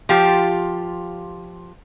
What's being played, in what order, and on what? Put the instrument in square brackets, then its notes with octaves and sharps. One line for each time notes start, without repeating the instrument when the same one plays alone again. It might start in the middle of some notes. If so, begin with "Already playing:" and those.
[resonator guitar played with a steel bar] F3 F4 G4